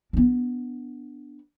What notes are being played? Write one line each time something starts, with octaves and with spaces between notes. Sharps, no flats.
B3 D4